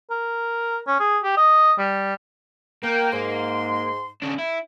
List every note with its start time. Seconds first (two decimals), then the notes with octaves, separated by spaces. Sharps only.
0.11 A#4
0.87 C#4
1.00 G#4
1.24 G4
1.37 D#5
1.79 G3
2.83 A#3 A#4 G5
3.13 G#2 C6
4.22 C#3 D4
4.39 E4